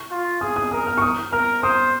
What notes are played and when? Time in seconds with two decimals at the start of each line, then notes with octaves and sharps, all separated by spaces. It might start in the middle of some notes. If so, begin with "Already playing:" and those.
Already playing: C#6
0.11 F4
0.41 G#4 D#6
0.56 D#6
0.71 A#4 D#6
0.87 F6
0.98 C#6
1.02 D#6
1.32 A#4 F6
1.63 C5 D#6